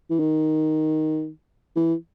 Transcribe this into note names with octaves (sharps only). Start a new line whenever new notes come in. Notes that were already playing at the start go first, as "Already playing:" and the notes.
E3
D#3
E3